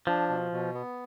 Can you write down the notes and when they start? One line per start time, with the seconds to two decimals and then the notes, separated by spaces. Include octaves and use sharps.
0.07 F3 D4
0.30 B2
0.52 B2
0.74 B3